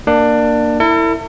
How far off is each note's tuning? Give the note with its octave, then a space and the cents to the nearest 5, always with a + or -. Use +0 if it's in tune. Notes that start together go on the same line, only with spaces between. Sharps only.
A#3 +0 D4 +20
E4 +0 A4 +45